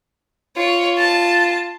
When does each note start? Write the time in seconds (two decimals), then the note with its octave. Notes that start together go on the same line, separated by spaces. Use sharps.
0.57 F4 C#5
0.98 A5